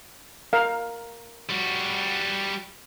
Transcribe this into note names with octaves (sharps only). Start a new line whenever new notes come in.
A#4 F5
G3 F#4